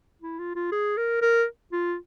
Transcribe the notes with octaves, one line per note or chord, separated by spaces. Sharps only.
E4
F4
F4
G#4
A#4
A#4
F4